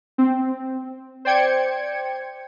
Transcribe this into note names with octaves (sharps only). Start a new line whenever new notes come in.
C4
C5 D5 G5 G#6 C#7